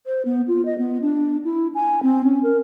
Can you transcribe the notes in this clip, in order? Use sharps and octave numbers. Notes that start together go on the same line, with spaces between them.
C5
B3
F4
D#5
B3
D4
E4
G#5
C4
C#4
A#4